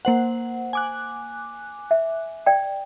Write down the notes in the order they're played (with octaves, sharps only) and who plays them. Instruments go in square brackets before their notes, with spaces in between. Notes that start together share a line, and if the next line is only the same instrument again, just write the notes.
[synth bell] A#3 C5 F#5
G#5 D6 F#6
[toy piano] E5
D5 G5